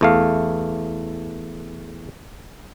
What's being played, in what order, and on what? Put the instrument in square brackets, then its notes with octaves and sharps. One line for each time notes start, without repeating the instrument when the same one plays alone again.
[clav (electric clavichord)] E2 A3 F5